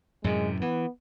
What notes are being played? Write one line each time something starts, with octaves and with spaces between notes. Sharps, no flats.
F#2 A2 C3 G#3
E3 B3